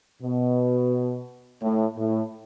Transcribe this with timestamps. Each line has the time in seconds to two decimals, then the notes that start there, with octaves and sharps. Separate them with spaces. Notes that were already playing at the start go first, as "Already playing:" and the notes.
0.22 B2
1.62 A2
1.97 A2